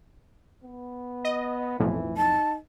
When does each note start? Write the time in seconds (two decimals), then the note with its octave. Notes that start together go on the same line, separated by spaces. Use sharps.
0.64 B3
1.25 D#5
1.80 B1 F2 A2 E3
2.17 D#4 A5